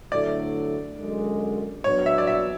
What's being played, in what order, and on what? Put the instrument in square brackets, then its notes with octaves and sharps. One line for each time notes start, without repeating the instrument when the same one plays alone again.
[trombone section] D2 D3 F#3 A3 E4 [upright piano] D5
[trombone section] F#2 D3 G#3
[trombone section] B2 F#3 B3 D4 [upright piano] C#5
[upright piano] E5
D5
E5